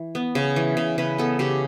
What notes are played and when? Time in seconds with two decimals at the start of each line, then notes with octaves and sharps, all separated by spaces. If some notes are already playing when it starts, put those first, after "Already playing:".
Already playing: E3
0.15 B3
0.35 C#3
0.56 E3
0.77 C#3
0.98 C#3 B4
1.18 B3 A4
1.39 C#3 G4